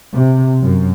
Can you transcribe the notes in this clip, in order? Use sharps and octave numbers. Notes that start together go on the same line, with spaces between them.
C3
F#2